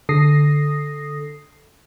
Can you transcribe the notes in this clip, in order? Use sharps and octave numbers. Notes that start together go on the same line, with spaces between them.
D3 A4 D#6 A#6 C7